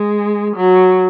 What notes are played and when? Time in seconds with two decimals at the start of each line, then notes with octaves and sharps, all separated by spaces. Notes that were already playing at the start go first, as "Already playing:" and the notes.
Already playing: G#3
0.57 F#3